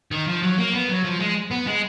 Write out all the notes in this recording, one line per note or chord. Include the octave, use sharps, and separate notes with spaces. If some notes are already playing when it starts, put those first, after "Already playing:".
D#3
F3
F#3
A#3
B3
F#3
F3
G#3
B3
G#3